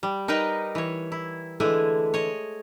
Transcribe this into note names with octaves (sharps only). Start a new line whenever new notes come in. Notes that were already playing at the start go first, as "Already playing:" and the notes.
G3
D#4 A#4 B4 D#5 G5
E3 C#5
E4
D3 E3 G#3 A3 E4 G#5
C#5 D#5